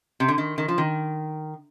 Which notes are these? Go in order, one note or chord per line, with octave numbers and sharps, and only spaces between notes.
C3
D3
D#3
D#3
F3
D#3